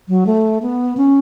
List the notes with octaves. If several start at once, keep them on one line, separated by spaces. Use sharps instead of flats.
F#3
A3
B3
C#4